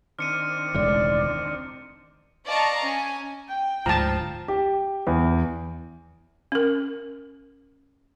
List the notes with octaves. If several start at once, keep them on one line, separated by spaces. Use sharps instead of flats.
D#3 C4 D4 F6 C#7 D#7
E1 C#2 A2 D5 F6
D5 D#5 F5 A5 A#5 C#6
C#4 G#5
G5
D1 D2 G#2 F3 A5 A#5
G4
E2
C#4 A#4